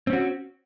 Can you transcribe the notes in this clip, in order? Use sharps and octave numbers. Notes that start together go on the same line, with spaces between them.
C4 C#4 F#4